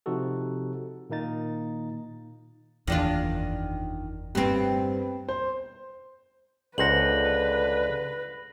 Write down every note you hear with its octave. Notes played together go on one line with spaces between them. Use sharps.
C3 F3 D#4 F#4 A4
A#2 D#3 A#3 D#4 A6
F#1 E2 D#3 D4 F4
G2 B3 C4
C5
C#2 D3 B4 C5 F#5 A#6 F#7